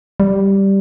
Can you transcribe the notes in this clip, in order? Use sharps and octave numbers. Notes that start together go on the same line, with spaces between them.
G3